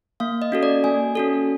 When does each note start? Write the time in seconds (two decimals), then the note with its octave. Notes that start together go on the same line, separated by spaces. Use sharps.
0.20 A#3 F5
0.42 D#5
0.52 C#4 F#4 A4
0.63 D5
0.84 A#3 G#5
1.15 C#4 F#4 A4